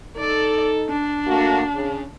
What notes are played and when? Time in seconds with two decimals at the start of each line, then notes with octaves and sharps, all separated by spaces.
0.16 D#4 A4 D5
0.89 D4
1.26 A3 A#3 F#4
1.73 C#3